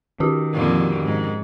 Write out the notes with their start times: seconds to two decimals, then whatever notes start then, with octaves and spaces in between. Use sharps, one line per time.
0.20 D#3 C#4 F#4 G4
0.53 F2 A#2 D3
1.02 G#2